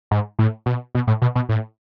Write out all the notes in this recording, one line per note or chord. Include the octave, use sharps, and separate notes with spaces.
G#2
A2
B2
B2
A2
B2
B2
A2